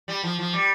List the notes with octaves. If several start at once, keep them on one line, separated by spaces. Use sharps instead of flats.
G3
F3
F3
G3